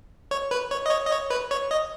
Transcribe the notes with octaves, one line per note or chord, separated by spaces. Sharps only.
C#5
B4
C#5
D#5
C#5
D#5
C#5
B4
C#5
D#5